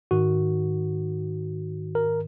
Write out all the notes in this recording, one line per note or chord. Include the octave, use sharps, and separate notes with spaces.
G#2 D#3 F#4
A#4